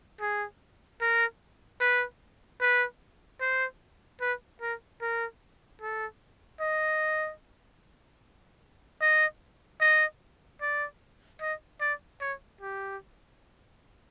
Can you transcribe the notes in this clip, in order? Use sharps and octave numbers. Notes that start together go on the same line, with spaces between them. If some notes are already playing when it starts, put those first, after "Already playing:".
G#4
A#4
B4
B4
C5
B4
A#4
A#4
A4
D#5
D#5
D#5
D5
D#5
D5
C#5
G4